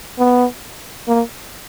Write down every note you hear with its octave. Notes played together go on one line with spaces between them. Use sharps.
B3
A#3